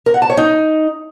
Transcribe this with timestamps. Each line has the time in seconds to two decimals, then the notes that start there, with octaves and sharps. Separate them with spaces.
0.06 A#4
0.14 F#5
0.22 A5
0.30 C#5
0.37 D#4